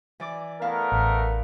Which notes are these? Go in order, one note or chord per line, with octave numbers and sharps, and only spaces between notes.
E3 D5 D6
A3 B3 E4 A#4 F5
A1